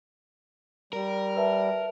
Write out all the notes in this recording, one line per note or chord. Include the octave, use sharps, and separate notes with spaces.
G3 A#4
B4 E5 A5